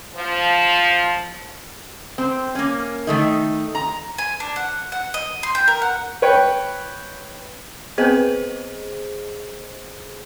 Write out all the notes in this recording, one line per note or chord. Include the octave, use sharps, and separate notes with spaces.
F3
C4
A#3 C#4
D#3 A3 D#4
A#5
G#5
D4
F#5
F#5
D#5
C6
G5
A#4
F#5
B4 C#5 G5
B3 C4 G#4 B4 C5 D#5